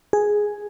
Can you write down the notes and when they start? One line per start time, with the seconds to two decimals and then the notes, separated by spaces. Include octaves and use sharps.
0.13 G#4